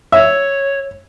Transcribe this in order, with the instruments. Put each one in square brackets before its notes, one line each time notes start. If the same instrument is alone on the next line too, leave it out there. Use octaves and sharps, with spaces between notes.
[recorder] C#5 [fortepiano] E5